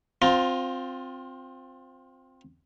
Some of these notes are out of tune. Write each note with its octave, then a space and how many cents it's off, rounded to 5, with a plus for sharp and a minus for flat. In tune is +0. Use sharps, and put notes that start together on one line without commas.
C4 +0 F4 +25 A#5 +10